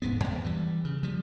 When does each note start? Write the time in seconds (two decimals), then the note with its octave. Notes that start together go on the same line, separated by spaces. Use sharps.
0.02 D#1 G#2 C3 B3
0.24 E2 G2
0.44 E3 G3
0.85 C#3
1.03 F3 G3